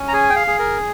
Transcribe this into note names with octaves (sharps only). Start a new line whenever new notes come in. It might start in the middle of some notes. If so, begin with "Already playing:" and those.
Already playing: C#4
A#5
G#4 G#5
G5
F5
G#4
A#4